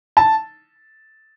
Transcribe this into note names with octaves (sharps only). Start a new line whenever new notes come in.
A5